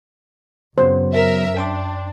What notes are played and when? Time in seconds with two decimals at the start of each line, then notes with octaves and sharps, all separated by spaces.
0.78 F#2 C#3 F#3 B3 C5
1.13 A#4 E5
1.57 D4 G5 C6 D6